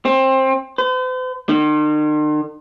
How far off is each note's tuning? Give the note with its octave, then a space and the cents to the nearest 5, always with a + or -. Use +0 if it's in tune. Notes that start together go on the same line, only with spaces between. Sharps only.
C4 +20
C5 -45
D#3 -45